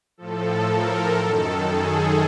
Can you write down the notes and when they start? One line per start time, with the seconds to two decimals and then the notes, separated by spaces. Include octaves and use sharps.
0.18 A2 F3 A4
0.67 A#4
1.17 F#2 D#3 A4
1.65 G#4